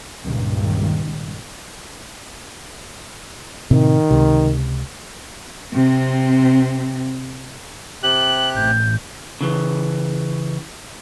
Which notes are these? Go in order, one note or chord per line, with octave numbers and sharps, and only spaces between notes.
C#2 G2 A#2 D#3
A2 C3 D#3 C4
C#2 C3
C3 C4
C3 G4 F#6 F#7
A1 G6
C#3 E3